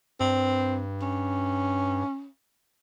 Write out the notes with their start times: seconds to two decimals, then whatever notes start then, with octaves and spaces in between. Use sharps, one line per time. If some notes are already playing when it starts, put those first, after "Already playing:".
0.21 G2 C4
1.02 C#4